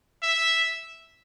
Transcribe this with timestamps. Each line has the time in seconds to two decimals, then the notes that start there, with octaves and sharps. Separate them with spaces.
0.23 E5